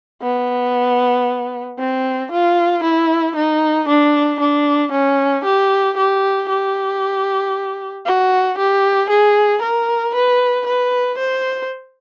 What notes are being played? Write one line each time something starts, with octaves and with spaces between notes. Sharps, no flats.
B3
C4
F4
E4
D#4
D4
D4
C#4
G4
G4
G4
F#4
G4
G#4
A#4
B4
B4
C5